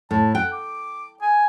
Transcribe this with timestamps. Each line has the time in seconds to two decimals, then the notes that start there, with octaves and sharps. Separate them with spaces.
0.11 A2 A5
0.35 F#5 G5
0.53 D6
1.22 G#5